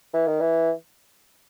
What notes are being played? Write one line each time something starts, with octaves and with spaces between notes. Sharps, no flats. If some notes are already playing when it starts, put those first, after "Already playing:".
E3
D#3
E3